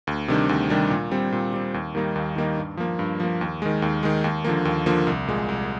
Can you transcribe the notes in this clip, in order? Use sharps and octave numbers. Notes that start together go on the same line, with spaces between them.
D2
C3 D#3 G3 D4
D2
C3 D#3 G3 D4
A#2
G3 C4
A#2
G3 C4
D#2
D#3 G3 A#3 D#4
D#2
D#3 G3 A#3 D#4
G2
F3 A#3
G2
F3 A#3
D#2
D#3 G#3
D#2
D#3 G#3
D#2
D3 F3 A#3
D#2
D3 F3 A#3
C2
A#2 G#3
C2